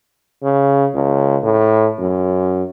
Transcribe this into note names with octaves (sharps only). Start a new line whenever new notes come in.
C#3
C#2
A2
F#2